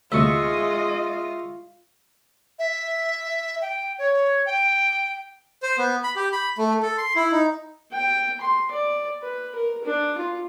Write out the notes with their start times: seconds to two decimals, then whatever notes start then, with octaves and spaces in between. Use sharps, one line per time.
0.12 D2 A2 C3 G#3 F4 D#5 E5 C#6
2.59 E5
3.62 G5
3.99 C#5
4.46 G5
5.62 C5
5.78 B3
6.04 B5
6.16 G4
6.33 B5
6.58 A3
6.83 A4
6.98 C6
7.16 E4
7.32 D#4
7.92 G5
8.41 C6
8.71 D5
9.22 B4
9.55 A#4
9.85 D4
10.18 F4